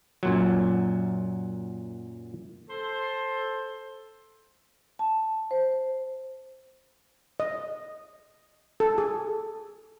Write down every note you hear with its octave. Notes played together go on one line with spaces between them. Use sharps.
F#2 A#2 F#3
A4 C5
A5
C5
D#5
A4
G#4